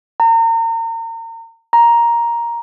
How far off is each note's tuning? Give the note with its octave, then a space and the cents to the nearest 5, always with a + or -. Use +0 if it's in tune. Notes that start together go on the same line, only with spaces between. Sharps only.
A#5 -35
A#5 +10